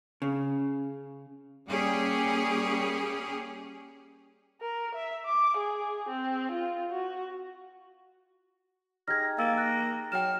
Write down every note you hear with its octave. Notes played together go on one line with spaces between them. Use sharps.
C#3
G3 A#3 C#4 G4 G#4
A#4
E5
D6
G#4
C4
F4
F#4
D#4 G4 G#4 F6 G#6 A#6
A#3 F5 E6 A6
F#6 A#6
F#3 G5 F6 E7